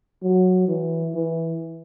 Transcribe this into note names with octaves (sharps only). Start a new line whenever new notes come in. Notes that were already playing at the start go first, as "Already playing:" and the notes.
F#3
E3
E3